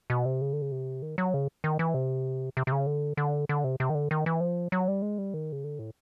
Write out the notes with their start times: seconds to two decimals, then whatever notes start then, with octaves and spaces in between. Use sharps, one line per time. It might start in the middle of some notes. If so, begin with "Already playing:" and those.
0.10 B2
0.25 C3
0.41 C#3
0.53 D3
0.62 C#3
0.72 C3
1.02 D#3
1.18 F#3
1.34 C#3
1.64 D#3
1.79 E3
1.94 C3
2.57 C3
2.67 C3
2.72 C#3
2.87 D3
3.17 D3
3.49 D3
3.64 C3
3.80 C3
3.90 D#3
3.95 D3
4.11 D#3
4.26 E3
4.41 F3
4.72 F#3
4.88 G3
5.02 G#3
5.18 G3
5.34 D#3
5.52 C#3
5.64 D3
5.79 A2